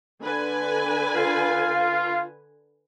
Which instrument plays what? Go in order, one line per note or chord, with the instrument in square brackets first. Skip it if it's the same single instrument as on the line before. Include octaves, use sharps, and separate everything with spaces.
[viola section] D3 B4 G#5
[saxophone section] F4